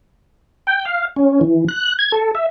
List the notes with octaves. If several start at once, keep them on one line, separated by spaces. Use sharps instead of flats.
G5
F5
C#4
E3
F#6
G#6
A4
E5